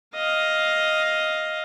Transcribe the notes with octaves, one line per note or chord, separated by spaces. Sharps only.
D#5 F5